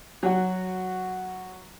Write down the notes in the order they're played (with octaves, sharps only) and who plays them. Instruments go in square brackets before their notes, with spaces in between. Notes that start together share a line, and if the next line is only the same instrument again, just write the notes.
[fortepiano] F#3 F#4